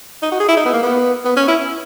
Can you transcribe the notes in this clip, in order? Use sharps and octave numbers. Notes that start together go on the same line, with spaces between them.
D#4
F#4
G#4
E4
D#4
B3
A#3
B3
B3
C#4
E4